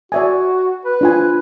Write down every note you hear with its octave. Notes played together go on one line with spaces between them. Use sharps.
F#4 D5 E5 G#5
B4
D4 F4 G#5